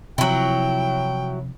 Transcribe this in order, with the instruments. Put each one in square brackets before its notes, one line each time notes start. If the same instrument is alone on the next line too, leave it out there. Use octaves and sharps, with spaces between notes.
[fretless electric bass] C3 F3 [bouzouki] F#3 E4 [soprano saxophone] G5